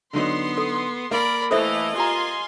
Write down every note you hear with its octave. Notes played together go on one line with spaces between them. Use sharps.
D3 F#3 B3 D#4 C6
A4
A#3 A#4 D5 B5
E3 A3 E4 A4 C5 D#5 E5
F4 G4 G#5 A#5 C6